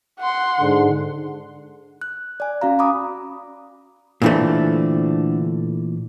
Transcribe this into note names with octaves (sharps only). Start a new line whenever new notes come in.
F#5 C6
G#2 D3
F#6
D5 G#5
C#4 F#4 F5 A#5
A#5 B5 D6 D#6
A#2 D3 E3 A3 C4 D4